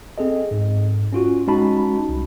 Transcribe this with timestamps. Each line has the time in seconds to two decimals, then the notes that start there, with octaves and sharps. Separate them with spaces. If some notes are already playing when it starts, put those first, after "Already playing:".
0.18 C4 G#4 A4 D#5
0.51 G#2
1.13 C#4 F4 F#4
1.48 G#3 C#4 D#4 F#4 A5 B5
2.09 C2